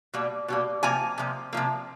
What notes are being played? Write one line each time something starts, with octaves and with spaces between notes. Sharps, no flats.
B2 G3 A#3
B2 G3 A#3
C3 F3 A#3 G#5 A#5
C3 F3 A#3
C3 F3 A#3